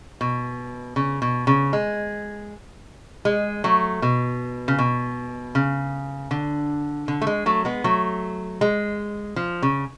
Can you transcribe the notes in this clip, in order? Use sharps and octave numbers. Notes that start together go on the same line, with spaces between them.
B2
C#3
B2
C#3
G#3
G#3
F#3 A3
B2
C#3
B2
C#3
D3
D3
A3
G#3
F#3 A3
G#3 B3
F#3 A3
G#3
F3
C#3